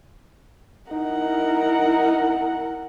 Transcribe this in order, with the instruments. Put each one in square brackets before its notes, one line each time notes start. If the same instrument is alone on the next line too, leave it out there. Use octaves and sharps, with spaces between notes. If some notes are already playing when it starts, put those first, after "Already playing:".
[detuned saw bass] D#4 [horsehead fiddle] E4 A#4 [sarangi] F#5